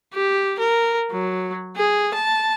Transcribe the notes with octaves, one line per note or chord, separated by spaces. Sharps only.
G4
A#4
F#3
G#4
A5